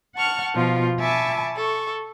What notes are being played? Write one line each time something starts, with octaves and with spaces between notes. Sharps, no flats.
F#5 A5 C#6 F6
B2 F3 F4
E5 G#5 A5 B5 C#6 D6
A4 C#6